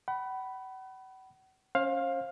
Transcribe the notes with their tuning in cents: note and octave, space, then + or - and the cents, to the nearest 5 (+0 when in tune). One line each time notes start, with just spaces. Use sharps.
F#5 +40 B5 +0
C#4 -5 C5 +35 F5 +10